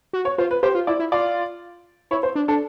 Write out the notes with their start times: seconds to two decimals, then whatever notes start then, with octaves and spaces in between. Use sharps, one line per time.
0.13 F#4
0.25 C#5
0.38 F4 C5
0.51 B4
0.63 G4 C5
0.75 F4
0.87 E4 D5
0.99 E4
1.12 F4 D5
2.11 E4 C#5
2.23 C5
2.35 D4
2.48 D4 A4